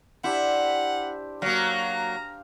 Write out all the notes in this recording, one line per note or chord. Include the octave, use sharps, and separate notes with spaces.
D4 E4 G4 C5 F#5
F#3 A#3 F5 A#5